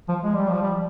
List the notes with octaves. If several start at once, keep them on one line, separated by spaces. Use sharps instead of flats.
F3
G#3
G3
F3
G3